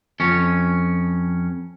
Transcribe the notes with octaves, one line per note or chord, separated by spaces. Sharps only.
F2 C#4